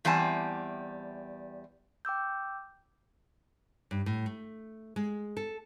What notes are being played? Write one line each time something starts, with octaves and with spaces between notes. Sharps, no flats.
E2 G3 C4 G#5 A5
G5 D6 E6 G6
G2
A2
A3
G#3
A4